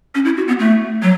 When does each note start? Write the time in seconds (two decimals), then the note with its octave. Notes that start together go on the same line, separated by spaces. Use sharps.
0.15 C#4
0.25 E4
0.37 F#4
0.48 B3
0.59 A3
1.02 F#3